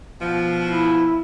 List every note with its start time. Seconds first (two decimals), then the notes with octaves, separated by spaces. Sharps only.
0.21 B2 F3
0.65 E4